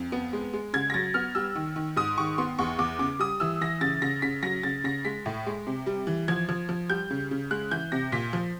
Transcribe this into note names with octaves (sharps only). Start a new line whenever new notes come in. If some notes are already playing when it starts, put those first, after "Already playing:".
Already playing: F2
B3
G#3
G#3
C#3 G#6
A#6
F#3 A6
B3 F6
G3 E6
D#3
D#3
G#2 D#6
D#3 C#6
B3 C6
E2 C#6
E2 D6
C#3 D6
G3 D#6
E3 E6
E3 A#6
C#3 A6
C#3 A#6
C#3 B6
F#3 A#6
C#3 A6
C#3 A#6
G#3 B6
A2
G#3
C3
G3
E3
F3 G#6
F3
F3
G3 G6
C#3
C#3
G#3 F#6
E3 G6
C3 A#6
A#2 B6
F3